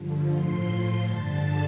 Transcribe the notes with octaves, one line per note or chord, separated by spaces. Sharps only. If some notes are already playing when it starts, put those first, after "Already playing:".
Already playing: G2 D3 F3
A2 F3 C6
A2 F3 C6
G2 D3 G3 A5